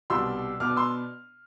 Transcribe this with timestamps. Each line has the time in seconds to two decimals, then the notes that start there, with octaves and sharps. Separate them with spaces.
0.10 C2 B2 G3 D4 C6 E6
0.60 B2 B3 D4 D6 F6
0.76 C6 E6